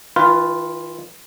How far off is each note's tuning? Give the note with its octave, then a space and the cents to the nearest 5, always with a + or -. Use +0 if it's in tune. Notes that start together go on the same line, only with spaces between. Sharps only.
E3 -45 F4 +0 B4 +10